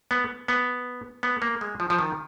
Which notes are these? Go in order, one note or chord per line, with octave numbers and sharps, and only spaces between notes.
B3
B3
B3
A#3
G#3
F3
F3
D#3